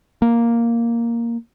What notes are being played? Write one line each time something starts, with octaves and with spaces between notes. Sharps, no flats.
A#3